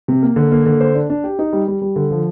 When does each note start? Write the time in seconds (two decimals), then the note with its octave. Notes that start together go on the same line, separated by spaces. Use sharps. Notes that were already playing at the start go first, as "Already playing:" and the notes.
0.08 C3
0.22 A#3
0.36 D3
0.52 A#3
0.66 D3
0.80 C5
0.95 D4
1.10 D4
1.24 G4
1.39 D#4
1.53 G3
1.68 G3
1.82 G3
1.96 D3
2.11 F3